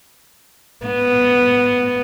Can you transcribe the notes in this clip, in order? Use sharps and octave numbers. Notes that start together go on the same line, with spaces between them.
B3